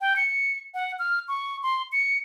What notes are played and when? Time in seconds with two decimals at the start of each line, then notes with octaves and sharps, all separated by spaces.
0.01 G5
0.16 C#7
0.74 F#5
0.99 F6
1.28 C#6
1.63 C6
1.92 C#7